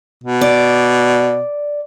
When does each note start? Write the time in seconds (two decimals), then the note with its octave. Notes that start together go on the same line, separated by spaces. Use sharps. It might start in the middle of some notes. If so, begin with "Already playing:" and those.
0.24 B2
0.41 D5